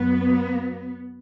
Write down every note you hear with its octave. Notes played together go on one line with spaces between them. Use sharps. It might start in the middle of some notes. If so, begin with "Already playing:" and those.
Already playing: F#2 F#3 B3